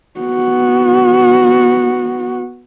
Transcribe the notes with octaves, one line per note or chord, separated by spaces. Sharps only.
B3 F#4